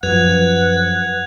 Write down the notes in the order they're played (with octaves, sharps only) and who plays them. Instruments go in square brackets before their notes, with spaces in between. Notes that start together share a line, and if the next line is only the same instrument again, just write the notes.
[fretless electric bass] F#2 F3 [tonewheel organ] B4 [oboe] F#5 [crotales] F#6 G#6 F7